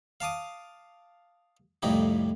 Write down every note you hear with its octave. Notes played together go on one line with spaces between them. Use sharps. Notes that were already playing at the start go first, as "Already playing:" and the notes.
F5 A5 D6 D#6
C2 F2 A2 D#4 G4